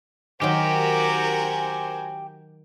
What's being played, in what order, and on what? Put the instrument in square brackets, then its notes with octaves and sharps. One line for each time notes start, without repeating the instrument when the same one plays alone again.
[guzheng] D#3 F#3 [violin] F#4 A#4 [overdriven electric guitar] G4 [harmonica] C5 G#5